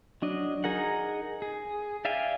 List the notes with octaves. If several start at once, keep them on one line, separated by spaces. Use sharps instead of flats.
F#3 D4 D#5
D#4 G#4 A#4 F#5
G#4
D5 E5 F5 G5 G#5